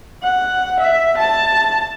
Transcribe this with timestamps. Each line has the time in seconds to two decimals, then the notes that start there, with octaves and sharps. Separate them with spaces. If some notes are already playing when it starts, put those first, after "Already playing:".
0.23 F#5
0.81 E5
1.18 A5